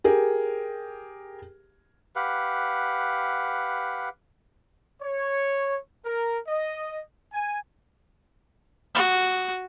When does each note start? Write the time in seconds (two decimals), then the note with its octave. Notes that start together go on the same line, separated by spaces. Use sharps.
0.04 G4 G#4 A#4
2.16 G4 B4 F5 F#5
5.02 C#5
6.05 A#4
6.48 D#5
7.33 G#5
8.95 F#4